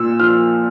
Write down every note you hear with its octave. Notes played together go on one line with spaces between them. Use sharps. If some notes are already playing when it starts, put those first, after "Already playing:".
Already playing: A#2 E6
F3 F6